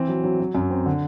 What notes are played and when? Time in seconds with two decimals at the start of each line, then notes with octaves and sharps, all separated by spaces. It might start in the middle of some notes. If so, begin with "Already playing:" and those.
Already playing: E3 C4
0.09 F#3
0.24 F#3
0.40 F#3
0.55 F#2
0.70 C4
0.86 D3